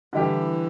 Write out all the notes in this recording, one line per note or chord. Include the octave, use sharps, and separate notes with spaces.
D3 E3 G3 E4 G4